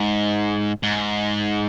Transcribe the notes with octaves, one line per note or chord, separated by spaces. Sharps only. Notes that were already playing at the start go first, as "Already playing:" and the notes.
Already playing: G#2
G#2